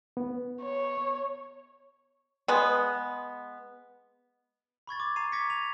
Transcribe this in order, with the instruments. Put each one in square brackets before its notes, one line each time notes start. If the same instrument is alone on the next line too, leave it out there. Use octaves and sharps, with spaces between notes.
[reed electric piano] B3
[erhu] C#5
[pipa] G#3 B3
[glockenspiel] B5 C#6 G#6 A6
D6
A#5 C7 D#7
C#6 D6 G#6 A#6 B6 C#7
D#7 F7